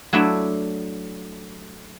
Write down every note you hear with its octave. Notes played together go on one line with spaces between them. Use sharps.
F#3 A3 D4 E4 E5